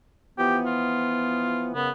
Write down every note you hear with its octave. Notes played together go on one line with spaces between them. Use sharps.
E3 F3 B3 G4
F4
F#2 C#3 B3